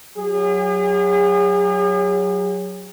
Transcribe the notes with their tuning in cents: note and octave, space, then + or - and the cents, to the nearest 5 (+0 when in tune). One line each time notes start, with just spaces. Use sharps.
F#3 +0 G#4 -40